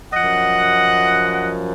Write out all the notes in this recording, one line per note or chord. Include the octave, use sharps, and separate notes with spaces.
F#2 F3 D#5 F#5